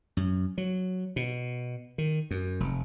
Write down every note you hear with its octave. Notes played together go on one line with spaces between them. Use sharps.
F#2
F#3
B2
D#3
F#2
F1